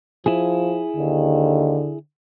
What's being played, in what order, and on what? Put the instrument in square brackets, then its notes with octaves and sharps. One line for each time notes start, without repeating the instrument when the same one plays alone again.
[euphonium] F3 [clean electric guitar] E4 G#4
[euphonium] D#2 [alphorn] D3